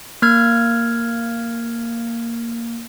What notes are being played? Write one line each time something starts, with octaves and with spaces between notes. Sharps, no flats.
A#3 F6 G#6